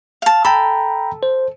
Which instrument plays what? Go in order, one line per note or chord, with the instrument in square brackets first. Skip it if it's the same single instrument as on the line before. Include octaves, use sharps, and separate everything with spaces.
[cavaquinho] F5 A5
[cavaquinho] A4 [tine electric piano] G5 A#5 B5
[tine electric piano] C5